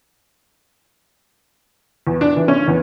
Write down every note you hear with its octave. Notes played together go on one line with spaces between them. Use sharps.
E2
D4
E3
C#4
E2